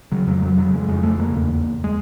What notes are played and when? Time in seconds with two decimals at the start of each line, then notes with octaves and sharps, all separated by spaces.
0.12 C#3 F#3
0.27 F2 F#3
0.38 G3
0.42 F2 F#3
0.58 C#3 F#3
0.73 F2 G#3
0.88 F2 G#3
1.03 F2 A3
1.18 C#3 A#3
1.34 E2
1.49 E2
1.64 E2
1.84 G#3